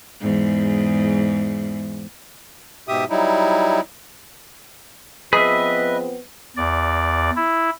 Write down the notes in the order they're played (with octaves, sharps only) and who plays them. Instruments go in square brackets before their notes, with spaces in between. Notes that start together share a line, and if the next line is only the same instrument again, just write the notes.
[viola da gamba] E2 G#2
[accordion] G#2 B2 G4 E5 D#6
F#3 G3 D#4 E4
[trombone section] F3 B3 C4 [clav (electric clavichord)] G#4 [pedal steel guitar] B4 E5 [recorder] D#5
[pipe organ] E2 D5
E4